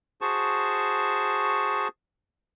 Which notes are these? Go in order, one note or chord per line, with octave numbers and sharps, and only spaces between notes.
F#4 G#4 C5 A5 C#6